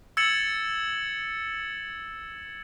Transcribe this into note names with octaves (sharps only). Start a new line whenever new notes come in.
E6 G#6 A6 C#7 E7 F#7